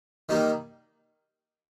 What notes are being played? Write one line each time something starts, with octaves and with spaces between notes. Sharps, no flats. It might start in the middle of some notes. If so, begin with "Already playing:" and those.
D#3 G3 A#3 D#4